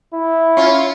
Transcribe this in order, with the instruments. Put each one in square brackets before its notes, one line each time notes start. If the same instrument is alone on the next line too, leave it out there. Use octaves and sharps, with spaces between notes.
[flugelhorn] E4
[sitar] C#4 F4